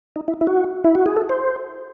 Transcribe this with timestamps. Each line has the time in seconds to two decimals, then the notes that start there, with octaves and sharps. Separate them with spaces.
0.16 D#4
0.28 E4
0.41 E4
0.47 F#4
0.84 E4
0.95 F#4
1.06 G#4
1.17 A4
1.29 C5